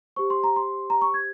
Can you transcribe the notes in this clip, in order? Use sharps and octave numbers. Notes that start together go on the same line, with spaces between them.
G4 C5 C#6
C6
A#5
C6
A#5
C#6
G#6